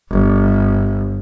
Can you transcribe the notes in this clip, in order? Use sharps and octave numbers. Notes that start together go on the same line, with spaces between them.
G1